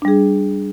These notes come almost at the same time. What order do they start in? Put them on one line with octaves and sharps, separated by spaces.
D4 G3 G#4